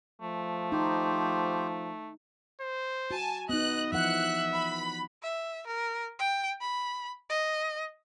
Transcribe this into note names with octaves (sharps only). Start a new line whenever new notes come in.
F3 A3
D#4 G4 C5
C5
F#4 G#5 A5
B3 D#4 D#5 F#6
E3 F3 E5 F#5 F#6
B5
E5
A#4
G5
B5
D#5